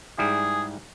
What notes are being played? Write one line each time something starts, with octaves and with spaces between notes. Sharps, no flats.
G#2 G3 E4 G#4